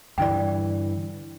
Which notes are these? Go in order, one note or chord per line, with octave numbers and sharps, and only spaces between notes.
G2 D3 E3 D5 G5